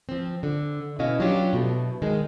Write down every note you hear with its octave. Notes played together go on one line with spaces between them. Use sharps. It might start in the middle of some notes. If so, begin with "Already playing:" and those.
F3 C4
D3
B2 B3 C#4 E4 D#5 F5
F#3 C#4 D4 F4 G4
B2 A3
D#3 G#3